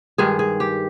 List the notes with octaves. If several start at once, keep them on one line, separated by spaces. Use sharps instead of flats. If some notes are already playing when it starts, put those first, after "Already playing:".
G2 D#3 G#3 G#4
G#4
G4